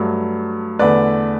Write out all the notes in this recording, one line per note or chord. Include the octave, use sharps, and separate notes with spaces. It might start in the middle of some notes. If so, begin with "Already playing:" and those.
Already playing: G2 F#3 A3
E2 D3 A3 B4 D5